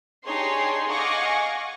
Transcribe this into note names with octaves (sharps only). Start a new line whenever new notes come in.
D4 D#4 G4 G#4 C#5 C6
D#5 F5 F#5 G#5 C#6 D6